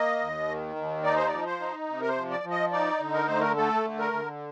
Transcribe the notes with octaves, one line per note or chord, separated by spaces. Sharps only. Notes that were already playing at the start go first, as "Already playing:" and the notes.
Already playing: A#3 D#5
D#2
D#3
D#2
D#4 D5
C5
F3 D5
C5
D#4
C3
A#4
C5
F3
D5
F3
D#5
D#4 D5
D3
A#4
A3 C5
A#4
A3 A4
D3
A#4
D3